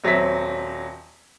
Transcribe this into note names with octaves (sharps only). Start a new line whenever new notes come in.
D#1 F#3 C4 E5 B6